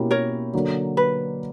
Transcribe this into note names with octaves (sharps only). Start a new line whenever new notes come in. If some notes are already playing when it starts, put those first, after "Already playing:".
Already playing: B2 A#3 C#4 E4 G4
A#4 C#5
D3 F#3 A#3
B4